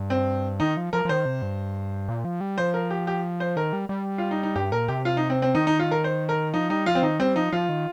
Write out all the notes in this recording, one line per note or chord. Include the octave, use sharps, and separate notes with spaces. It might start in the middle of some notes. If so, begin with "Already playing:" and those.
Already playing: G2
C4
D#3 D#4
F3
F3 A#4
F3
D#3 C5
C3
G2
A#2
F3
G3
F3 C5
A#4
G4
G4
C5
D#3 A#4
G3
G3
F4
D#4
D#4
G2 G4
A#2 A#4
C3 G4
F4
D#4
C4
C4
D#3 D#4
D#4
F4
A#4
C5
A#4
F3 D#4
G3 D#4
F3 F4
C4
D#3 D#4
G3 C4
F3 D#4
F3 F4
D#3